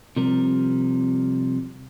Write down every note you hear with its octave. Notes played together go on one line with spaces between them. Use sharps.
C3 F3 G3 A#4